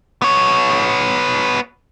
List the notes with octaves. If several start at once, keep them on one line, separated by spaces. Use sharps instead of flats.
B3 C#5